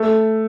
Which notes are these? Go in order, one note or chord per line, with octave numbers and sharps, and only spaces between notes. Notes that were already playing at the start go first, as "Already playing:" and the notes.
Already playing: A3